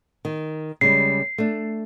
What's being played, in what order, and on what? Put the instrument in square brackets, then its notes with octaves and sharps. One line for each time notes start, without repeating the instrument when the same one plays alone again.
[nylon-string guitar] D#3
[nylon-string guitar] C#3 G3 G#3 [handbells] C7
[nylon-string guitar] A3 D4